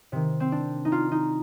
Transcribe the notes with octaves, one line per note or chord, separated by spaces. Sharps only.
C3 D#3
C4
D4
D#4
F4
D#4